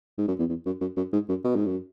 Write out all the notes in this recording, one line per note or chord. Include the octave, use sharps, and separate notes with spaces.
G#2
F#2
E2
E2
F#2
F#2
F#2
G#2
F#2
B2
G#2
F#2